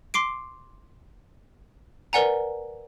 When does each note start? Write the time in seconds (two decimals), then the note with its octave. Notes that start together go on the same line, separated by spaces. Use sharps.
0.14 C6 D6 C7 D7
2.13 A#4 B4 D5 F#5 G#5 A#5